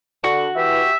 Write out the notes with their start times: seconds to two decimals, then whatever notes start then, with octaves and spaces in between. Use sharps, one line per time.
0.24 D3 F#4
0.55 E3 G4 E5